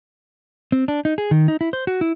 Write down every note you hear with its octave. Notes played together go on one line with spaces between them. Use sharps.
C4
D4
D#4
G#4
D#3
D#4
E4
C5
F#4
E4